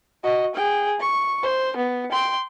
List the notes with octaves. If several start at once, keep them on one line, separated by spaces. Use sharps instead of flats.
F#4 D#5
G#4 G5
C#6
C5
B3
G5 C6